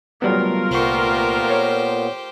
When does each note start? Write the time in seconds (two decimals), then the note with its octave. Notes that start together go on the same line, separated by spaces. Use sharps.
0.22 F#3 G3 A3 B3 F4 A#4
0.71 C2 A#2 B3 G4 C5 C#6
1.50 C#5